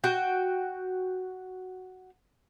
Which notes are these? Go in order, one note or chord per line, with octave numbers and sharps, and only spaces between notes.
F#4 G5